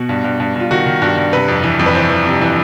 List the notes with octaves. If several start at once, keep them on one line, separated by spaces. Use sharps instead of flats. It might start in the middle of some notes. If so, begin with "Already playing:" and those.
Already playing: B2 F#4
G2
G2
G2
G2 F4
D#3 F#4
D#3
G2 F#4
G2
C3 B4
F2
E3
F2
B4
E3 C5
E3
C3
E3